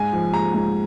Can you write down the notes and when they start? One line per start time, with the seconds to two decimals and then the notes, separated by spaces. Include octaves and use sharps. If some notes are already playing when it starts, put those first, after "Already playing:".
Already playing: G#2 G#5
0.13 F3
0.33 G#3 A#5
0.54 G#2